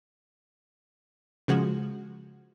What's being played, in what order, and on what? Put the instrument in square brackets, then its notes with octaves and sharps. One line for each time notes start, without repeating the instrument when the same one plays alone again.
[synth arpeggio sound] C#3 F3 G#3 F#4